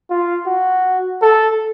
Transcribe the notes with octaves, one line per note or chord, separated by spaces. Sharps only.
F4
F#4
A4